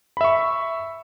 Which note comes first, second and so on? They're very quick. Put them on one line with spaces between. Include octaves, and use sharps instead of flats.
B5 E5 C#6